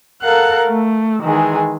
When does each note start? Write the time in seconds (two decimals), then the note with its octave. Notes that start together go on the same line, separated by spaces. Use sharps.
0.21 A4 A#4 F5 F#5 F#6
0.67 A3
1.23 D#3 E3 G#3 G#4